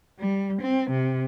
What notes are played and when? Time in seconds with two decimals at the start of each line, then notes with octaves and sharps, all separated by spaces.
0.19 G3
0.62 C4
0.91 C3